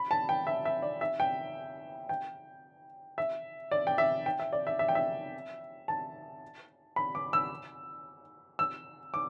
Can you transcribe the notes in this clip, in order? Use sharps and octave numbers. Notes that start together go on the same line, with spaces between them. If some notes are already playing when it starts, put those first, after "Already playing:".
Already playing: B5
A5
G5
E5
E5
D5
E5
G5
G5
E5
D5
G5
E5
G5
E5
D5
E5
E5
G5
E5
A5
B5
D6
E6
E6
D6